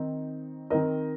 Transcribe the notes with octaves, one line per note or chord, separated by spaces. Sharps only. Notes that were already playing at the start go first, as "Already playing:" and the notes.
Already playing: D#3 C4 D#4
D#3 C4 D#4 A#4 D#5